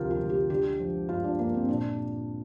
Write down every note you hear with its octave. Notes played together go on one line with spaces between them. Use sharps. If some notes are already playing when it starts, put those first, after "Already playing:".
Already playing: D2 C3 F3 F4 G4 A#4
F4
D2
G4
D3 G4
F3
G2 F4
D4
G2 A#3
C4
A#2 D4